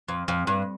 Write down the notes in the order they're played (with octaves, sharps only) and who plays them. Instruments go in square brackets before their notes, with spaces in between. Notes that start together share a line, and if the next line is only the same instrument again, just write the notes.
[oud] F2
F2
G2